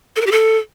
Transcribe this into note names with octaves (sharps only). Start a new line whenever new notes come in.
A4
A#4
G4
A4